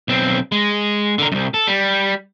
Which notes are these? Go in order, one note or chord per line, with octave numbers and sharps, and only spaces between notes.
B1 C4
G#3
D3 A#4
C2 F#2
A4
G3